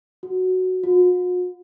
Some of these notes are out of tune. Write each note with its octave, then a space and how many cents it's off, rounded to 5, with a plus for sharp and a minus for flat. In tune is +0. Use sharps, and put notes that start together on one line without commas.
F#4 +0
F#4 -45